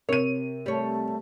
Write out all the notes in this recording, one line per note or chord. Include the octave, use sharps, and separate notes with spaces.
C3 A#4 C#5 D#7
G3 A3 C#5